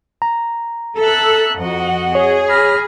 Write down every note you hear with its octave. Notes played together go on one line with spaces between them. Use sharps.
A#5
A4 E5 E6 F#6
F2 F#4 D#5 F#5
G#4 C#5
B5 F6 A#6